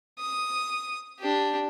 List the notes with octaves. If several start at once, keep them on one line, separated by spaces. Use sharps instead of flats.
D#6
D4 G4